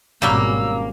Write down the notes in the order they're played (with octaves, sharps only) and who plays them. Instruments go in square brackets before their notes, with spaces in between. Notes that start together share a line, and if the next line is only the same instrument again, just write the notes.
[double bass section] G#1 B2 C#4 [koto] F#3 G3 G5 [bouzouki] A#3 [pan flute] E6